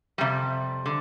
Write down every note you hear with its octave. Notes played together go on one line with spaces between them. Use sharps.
F2 C3 G3
D3